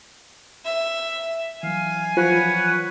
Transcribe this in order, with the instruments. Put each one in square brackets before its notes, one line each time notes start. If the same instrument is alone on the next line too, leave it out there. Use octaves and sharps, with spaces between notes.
[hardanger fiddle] E5
[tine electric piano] E3 F#3 [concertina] F5 [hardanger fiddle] G#5
[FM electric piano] F3 [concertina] B4 C#5 F#5